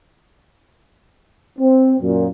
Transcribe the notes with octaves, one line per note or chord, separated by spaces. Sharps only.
C4
F#2 A#2